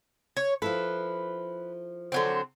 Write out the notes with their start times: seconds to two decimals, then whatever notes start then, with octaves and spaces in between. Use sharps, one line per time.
0.37 C#5
0.62 F3 E4 A4 B4
2.12 D3 F#3 C4